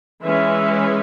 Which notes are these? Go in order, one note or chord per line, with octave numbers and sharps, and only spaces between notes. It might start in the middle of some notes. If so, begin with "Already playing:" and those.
E3 G#3 C#4 B4 E5